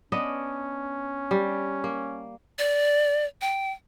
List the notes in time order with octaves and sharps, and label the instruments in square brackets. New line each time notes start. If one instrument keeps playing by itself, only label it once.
[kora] B3 D4 D#5 [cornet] C#4
[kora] G3
A#3
[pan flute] D5
G5